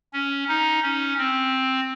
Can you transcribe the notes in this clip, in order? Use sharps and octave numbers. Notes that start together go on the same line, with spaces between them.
C#4
D#4
C#4
C4